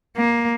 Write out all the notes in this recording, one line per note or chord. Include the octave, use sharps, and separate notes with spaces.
A#3